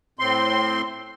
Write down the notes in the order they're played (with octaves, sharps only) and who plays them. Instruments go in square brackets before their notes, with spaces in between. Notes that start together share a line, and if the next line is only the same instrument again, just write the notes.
[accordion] A2 C4 C6